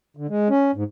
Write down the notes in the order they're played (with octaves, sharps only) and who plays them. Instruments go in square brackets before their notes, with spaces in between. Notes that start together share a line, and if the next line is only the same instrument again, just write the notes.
[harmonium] D3
G#3
C#4
G#2